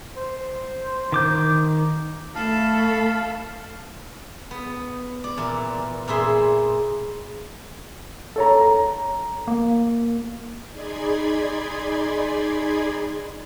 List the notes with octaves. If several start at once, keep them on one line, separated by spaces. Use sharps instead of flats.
C5
D#3 D6 G6
A3 A4 F5 A5 B5
B3
D5
A#2 E3
A#2 E4 G#4 E5 C6
A4 C#5 A#5
A#5
A#3
D#4 G#4 D5 B5 C6 G#6